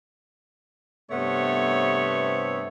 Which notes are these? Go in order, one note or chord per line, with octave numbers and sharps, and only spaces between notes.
G2 C3 A3 B3 C5 C#5